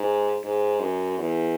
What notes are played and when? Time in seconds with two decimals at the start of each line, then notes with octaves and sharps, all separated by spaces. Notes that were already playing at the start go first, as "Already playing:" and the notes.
Already playing: G#2
0.44 G#2
0.80 F#2
1.18 E2